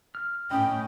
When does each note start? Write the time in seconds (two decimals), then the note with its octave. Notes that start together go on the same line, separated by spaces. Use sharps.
0.15 F6
0.51 A2 C#4 D#5 G5 B5 D#6